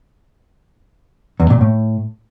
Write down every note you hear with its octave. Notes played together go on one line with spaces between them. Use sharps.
E2
A#2
A2